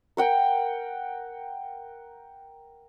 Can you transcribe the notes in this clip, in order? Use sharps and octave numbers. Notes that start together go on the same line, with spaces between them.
A#4 F#5 G5